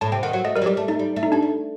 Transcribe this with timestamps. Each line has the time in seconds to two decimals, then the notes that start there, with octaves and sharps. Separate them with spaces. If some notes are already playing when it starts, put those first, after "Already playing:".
0.01 A2 A5
0.12 C3 G5
0.23 D#3 F#5
0.33 F#3 F#5
0.45 A3 D#5
0.56 G3 A#4
0.62 F#3
0.66 G3 G4
0.77 A3
0.88 A3 D#4
0.99 G3
1.16 A3
1.23 D#4
1.32 G3 D4
1.43 A3